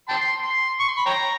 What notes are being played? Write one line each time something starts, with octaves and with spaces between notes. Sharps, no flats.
G5 A5 C6
C6
C#6
C6
B5
C#5 G5 A#5